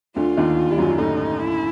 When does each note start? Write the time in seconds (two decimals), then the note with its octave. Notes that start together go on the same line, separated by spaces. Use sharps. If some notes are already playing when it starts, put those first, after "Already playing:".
0.16 D2 D3 F4
0.37 D#2 D#3
0.71 G3
0.78 F#2 F#3
0.98 A2 A3 D#4
1.40 E4